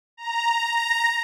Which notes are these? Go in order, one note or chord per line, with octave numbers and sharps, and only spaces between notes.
A#5
A#5